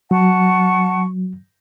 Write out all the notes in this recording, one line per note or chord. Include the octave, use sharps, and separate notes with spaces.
F#3 F#5 A5 C#6